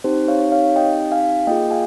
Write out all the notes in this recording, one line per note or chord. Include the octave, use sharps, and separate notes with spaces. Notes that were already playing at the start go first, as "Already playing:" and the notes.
C4 D#4 G4 C5
C#5 F5
C#5 F5
D#5 G5
F5 G#5
A#3 F4 G#4 D#5 G5
F5 G#5